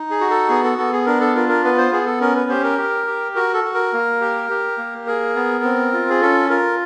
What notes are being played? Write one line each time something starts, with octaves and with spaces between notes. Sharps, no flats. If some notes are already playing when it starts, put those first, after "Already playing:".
Already playing: D#4
G#4
F#4
A4
B3 G#4
A4
B3 A4
G#4
D4 A#4
A4
F4 A#4
A#4
B3 B4
C5
B3 G#4
A4
C#4 A#4
B4
G4 C5
A#4
G4
G4
F#4 A#4
A4
F#4
A#4
A#3
G4
G4
A#3
G#4 A#4
B3
C4
F4
G#4
C#4 A4
F4 A#4